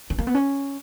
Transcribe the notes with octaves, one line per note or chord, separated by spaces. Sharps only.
C#4
A#3
B3
C#4